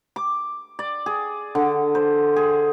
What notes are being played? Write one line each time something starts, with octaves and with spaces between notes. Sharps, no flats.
D6
D5
G#4
D3
C5
G#4